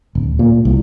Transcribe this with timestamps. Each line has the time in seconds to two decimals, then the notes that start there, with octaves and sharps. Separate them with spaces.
0.15 D1
0.39 A#2
0.65 C2